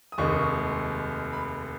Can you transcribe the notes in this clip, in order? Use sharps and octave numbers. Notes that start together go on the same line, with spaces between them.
D#6
F1 D#2 D#3 G#3 C#6
B5